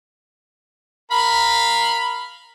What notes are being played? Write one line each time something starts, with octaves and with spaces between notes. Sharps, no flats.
A#4 F5 B5